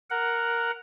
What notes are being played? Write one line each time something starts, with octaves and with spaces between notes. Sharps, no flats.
A#4 F#5